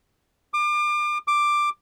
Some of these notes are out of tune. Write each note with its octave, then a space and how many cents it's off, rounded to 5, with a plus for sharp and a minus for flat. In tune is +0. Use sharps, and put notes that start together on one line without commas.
D6 +35
D6 +10